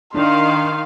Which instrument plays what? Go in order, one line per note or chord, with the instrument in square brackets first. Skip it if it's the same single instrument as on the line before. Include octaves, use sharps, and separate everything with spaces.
[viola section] D#3 F5 [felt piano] D4 [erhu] C6